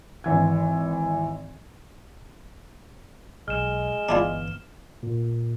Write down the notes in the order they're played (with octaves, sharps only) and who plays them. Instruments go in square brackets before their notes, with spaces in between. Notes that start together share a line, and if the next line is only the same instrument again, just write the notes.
[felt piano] G#1 E3 G#6
[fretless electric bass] B1 [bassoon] G#3 [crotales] F6 E7
[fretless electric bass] G1 E3 B3 [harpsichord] D4 E4 F4
[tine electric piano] A#2